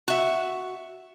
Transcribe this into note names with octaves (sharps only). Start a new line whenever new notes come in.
F#4 E5